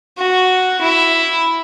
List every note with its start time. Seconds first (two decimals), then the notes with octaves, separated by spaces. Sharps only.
0.18 F#4
0.81 E4